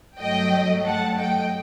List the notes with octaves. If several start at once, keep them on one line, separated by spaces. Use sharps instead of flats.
G2 F#3 A3 D#5 G5
G2 F#3 A3 F#5 A5
D#5 G5